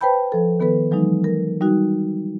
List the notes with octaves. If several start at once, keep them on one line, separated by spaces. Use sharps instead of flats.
B4 C5 G5 A5 B5 G6
F3 A4
D#3 B3 A4 B4
E3 F#3 G#3 D#4
A#4
G3 D#4 F#4